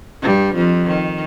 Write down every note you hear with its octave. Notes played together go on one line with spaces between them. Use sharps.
G2 G3
F2 F3
D#3